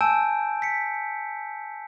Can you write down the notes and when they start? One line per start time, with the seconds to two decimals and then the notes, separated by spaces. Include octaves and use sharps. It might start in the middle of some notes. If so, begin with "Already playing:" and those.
0.01 G#5 A5 E6 G6 D7
0.62 B6 C#7